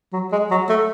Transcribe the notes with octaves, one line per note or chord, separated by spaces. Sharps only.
F#3
G#3
F#3
A3